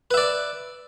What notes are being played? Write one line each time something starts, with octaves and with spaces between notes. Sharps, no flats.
B4 D5 E5